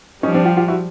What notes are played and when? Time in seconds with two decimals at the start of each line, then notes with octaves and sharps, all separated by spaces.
0.23 F3 G3 C#4 D#4
0.34 C4 D4
0.45 F4 G4
0.57 F4 G4
0.68 E4 F#4